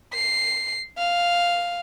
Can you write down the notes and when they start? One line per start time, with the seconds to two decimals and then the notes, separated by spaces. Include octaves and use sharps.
0.14 C7
0.98 F5